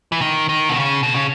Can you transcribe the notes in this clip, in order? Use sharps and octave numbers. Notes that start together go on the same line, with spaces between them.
E3
D#3
D#3
B2
C#3
B2
C#3